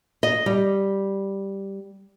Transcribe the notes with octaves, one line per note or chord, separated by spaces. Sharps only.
D#5
G3